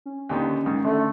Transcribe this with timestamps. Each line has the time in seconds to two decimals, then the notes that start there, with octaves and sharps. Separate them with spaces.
0.06 C#4
0.29 D#2 D3 D#3
0.66 G#2 D#3
0.84 D3 A3